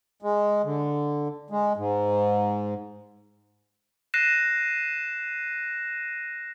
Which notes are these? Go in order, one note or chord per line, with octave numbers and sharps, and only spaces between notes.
G#3
D3
G#3
G#2
F#6 A#6 C7 D#7 E7